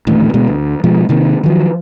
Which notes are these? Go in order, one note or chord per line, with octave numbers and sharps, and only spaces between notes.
D#1 A1 A2 D3
D2 B2 G#3 B3
D2
B2 F3 G#3
C3 D#3 A#3
D#3 F3 F#3